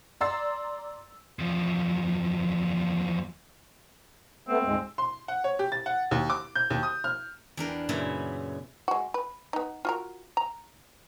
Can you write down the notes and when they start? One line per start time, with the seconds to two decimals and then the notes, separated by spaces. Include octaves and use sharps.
0.21 D5 A#5 C6 E6 A6 C7
1.39 E2 F3
4.48 A3 B3 C4
4.64 D2 G#2 G#3
4.98 C6
5.28 F#5
5.44 C#5
5.59 G4
5.72 A6
5.86 F#5
6.11 D#2
6.30 D6
6.56 G6
6.70 D#2
6.83 D#6
7.04 F6
7.57 E2 D4 A#4 G5
7.89 F#2 A#2 C#3 B3 E4
8.88 G#3 F#4
9.14 B4
9.53 B3 D#4
9.85 F4 F#4 A#4
10.37 A#5